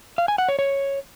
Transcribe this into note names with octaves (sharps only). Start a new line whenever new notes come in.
F5
G#5
F#5
C#5
C#5